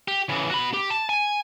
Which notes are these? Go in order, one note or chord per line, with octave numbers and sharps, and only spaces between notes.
G4
C#3 E3
F#4 B5
G4
A5
G#5